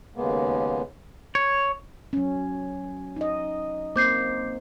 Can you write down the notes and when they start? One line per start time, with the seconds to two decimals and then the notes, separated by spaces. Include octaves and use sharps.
0.15 D#2 C#3 G#3 A#3 B3
1.35 C#5
2.13 F#3 C#4
3.16 D#4 D#5
3.96 A#3 C4 C5 D6 G6 C7